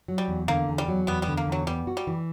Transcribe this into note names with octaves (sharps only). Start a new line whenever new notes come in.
F#3
G3
E2
D3 A#3
E2
G3
F#3
E2 G3 B3
G3 B3
D3
A#3
E2 F#3
G3 B3
F#4
G3
E3